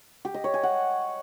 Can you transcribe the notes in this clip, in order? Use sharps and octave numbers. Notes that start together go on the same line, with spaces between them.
G4
D#5
C#5
G#5
F#5